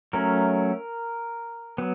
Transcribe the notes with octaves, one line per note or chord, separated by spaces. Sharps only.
F#3 A3 C#4 A#4
F#3 B3